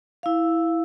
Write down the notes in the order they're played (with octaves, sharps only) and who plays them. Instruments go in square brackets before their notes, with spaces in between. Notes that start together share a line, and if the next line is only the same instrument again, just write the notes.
[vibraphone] E4 F5